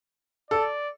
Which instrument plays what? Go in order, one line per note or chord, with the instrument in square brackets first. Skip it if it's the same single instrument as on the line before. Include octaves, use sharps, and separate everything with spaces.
[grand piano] A4 [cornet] D5